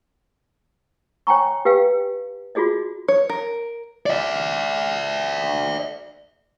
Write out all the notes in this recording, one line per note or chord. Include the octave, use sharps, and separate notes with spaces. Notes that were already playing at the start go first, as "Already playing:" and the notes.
C#5 G5 G#5 A#5 C#6
G4 B4 F5 G5
F4 F#4 G#4 D5 D#5
C#5
A#4
D5 E5